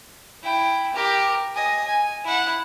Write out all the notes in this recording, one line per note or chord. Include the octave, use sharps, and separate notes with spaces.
E4 G5
G4 A#4
D#5 G#5
G#5
E4 F#5